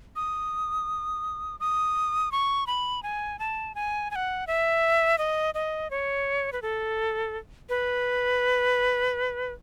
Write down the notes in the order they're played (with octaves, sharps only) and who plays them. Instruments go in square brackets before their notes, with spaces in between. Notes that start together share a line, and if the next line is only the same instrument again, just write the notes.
[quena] D#6
D#6
C#6
B5
G#5
A5
G#5
G#5
F#5
E5
D#5
D#5
C#5
B4
A4
B4